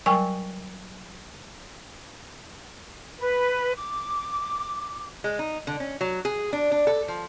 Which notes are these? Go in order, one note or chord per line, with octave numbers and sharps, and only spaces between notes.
F#3 G3 A#4 G5 G#5 C#6
B4
D6
G#3
D#4
D3
C#4
F#3
G#4
D4
D4
A4
F3